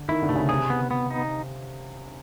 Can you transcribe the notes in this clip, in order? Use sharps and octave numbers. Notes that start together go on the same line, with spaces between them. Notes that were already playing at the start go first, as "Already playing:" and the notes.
Already playing: D3
D#3 E4
D3
C3 A3
C#3
C3 G#4
B3
B3
D#4